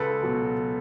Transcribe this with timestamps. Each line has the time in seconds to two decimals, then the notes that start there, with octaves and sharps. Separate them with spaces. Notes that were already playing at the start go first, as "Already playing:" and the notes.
Already playing: C#2 A4 B4
0.23 B2 F#3